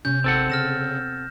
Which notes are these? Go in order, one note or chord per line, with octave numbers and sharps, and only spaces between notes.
C3 B3 C#4 G6
G#1 C4 A4 F#5
C#3 F6 A#6 E7